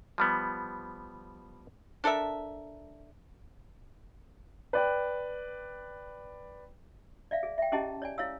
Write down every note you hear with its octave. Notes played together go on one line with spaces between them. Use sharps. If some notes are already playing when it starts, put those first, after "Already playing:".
F3 G3 B3
D4 A4 A#4 E5
B4 D5 G5
D5 E5 F5
G#4
E5 G5
C#4 E4 G4 G#4 D#5 A5
C#5 D5 G#5
E4 C#5 F5 E6